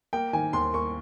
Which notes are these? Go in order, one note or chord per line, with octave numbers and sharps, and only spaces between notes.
A#3 G5
D#3 G#5
D#2 C6
A#3 C#6